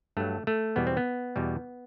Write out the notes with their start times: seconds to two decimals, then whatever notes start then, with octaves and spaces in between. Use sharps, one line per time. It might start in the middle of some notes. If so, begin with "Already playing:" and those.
0.17 G2 F#3 A3
0.47 A3
0.76 E2 B2 G3 B3
0.87 C4
0.97 B3
1.36 E2 B2 G3